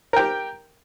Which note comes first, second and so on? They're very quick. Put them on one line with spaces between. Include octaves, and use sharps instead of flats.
A#4 G5 G4